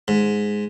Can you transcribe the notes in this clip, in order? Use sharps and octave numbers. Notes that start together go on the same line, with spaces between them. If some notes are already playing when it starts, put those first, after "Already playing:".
G#2